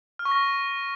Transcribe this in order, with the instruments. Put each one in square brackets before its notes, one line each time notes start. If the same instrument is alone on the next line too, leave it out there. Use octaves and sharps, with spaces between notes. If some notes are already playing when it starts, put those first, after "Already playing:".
[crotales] F6
C#6
A#6